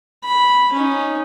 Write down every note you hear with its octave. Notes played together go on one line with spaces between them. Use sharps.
B5
C#4 D#4